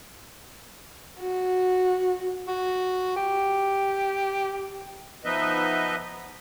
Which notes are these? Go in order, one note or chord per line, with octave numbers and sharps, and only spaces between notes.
F#4
F#4
G4
F3 B3 D#4 B4 D#5 E5